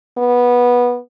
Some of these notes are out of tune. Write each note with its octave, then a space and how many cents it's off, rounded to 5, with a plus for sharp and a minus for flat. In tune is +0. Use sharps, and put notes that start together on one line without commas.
B3 -15